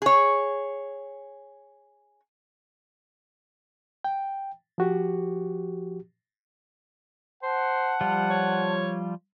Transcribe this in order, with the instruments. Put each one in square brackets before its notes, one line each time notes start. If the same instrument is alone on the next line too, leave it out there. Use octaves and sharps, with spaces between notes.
[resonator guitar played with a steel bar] G#4 C#5
[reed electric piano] G5
F3 F#4 G4
[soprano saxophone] C5 [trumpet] F#5 [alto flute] A5
[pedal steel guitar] F3 G3 F4
[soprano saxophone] C#5